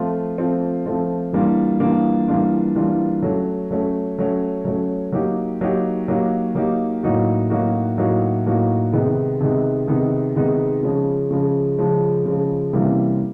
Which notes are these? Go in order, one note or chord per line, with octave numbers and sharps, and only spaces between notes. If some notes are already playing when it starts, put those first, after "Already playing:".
Already playing: F3 A3 C4 F4
F3 A3 C4 F4
F3 A3 C4 F4
E3 G3 A#3 D4 F4
E3 G3 A#3 D4 F4
E3 G3 A#3 D4 F4
E3 G3 A#3 D4 F4
F#3 A3 C#4
F#3 A3 C#4
F#3 A3 C#4
F#3 A3 C#4
F#3 A#3 D#4 G4
F#3 A#3 D#4 G4
F#3 A#3 D#4 G4
F#3 A#3 D#4 G4
A2 F#3 A#3 D#4 F#4
A2 F#3 A#3 D#4 F#4
A2 F#3 A#3 D#4 F#4
A2 F#3 A#3 D#4 F#4
C3 D#3 G#3 B3 D#4
C3 D#3 G#3 B3 D#4
C3 D#3 G#3 B3 D#4
C3 D#3 G#3 B3 D#4
C#3 F3 G#3 C#4
C#3 F3 G#3 C#4
C#3 F3 G#3 C#4
C#3 F3 G#3 C#4
C3 E3 G3 A#3 C#4